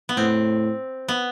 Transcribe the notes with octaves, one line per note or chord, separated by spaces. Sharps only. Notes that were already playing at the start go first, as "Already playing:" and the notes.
B3
A2 C4
B3